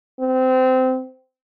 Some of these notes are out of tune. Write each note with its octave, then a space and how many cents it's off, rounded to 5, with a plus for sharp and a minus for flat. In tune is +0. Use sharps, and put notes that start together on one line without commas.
C4 -20